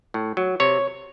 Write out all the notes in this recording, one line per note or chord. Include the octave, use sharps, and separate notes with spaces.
A2
F#3
C3 C#5